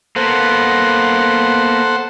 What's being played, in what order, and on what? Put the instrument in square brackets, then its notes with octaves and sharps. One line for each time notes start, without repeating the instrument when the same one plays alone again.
[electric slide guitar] A#3 B3 [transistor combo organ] A4 C5 F#5